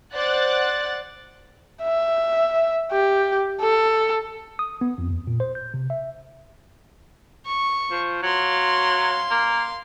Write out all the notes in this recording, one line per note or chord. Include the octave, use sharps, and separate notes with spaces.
C5 D5 F#5 F#6 A6
E5
G4
A4
D#6
B3
F2
E2
A#2
C5
G6
C3
E5
C#6
F3
F#3 F5 C6
A#3